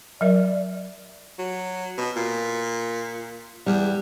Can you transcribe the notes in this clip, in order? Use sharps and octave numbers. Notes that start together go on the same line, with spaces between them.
F#3 A#4 D5 E5
F#3
B2
A#2
E2 G3